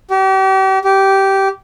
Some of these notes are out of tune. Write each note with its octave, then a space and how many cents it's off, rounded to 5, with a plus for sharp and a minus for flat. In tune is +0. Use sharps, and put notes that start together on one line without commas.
G4 -40
G4 -15